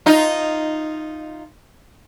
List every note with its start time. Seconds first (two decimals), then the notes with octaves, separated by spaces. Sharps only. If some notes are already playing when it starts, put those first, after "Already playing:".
0.06 D#4 F4